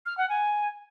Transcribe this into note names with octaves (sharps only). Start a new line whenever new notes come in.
F6
F#5
G#5